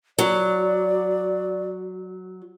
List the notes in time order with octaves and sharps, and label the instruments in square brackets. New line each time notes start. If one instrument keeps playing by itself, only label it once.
[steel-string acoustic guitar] F#3 [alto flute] D5